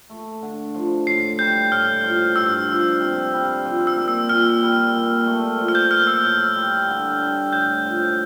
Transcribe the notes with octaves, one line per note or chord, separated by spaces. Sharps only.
A3
D3
F3
A2 C7
G3 G6
A2 F6
F3
G2 E6
F3
C3
G3
F3
E6
A#3
E6
A#2 F6
G3
A#2
A3
F3
F6
G6
A#3 F6
E6
A2
G3
D3
G3
A2 G6
F3